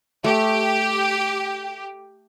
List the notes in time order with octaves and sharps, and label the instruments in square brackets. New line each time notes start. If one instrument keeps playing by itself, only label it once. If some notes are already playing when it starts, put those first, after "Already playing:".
[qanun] A3 [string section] G4